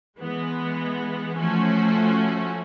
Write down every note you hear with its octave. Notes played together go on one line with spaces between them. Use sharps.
E3 G#3 B3
F3 A3 C#4 F#4